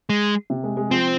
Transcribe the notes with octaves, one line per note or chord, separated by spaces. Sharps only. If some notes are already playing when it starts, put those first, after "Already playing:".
G#3
C3
G#3
G#3
F3 C4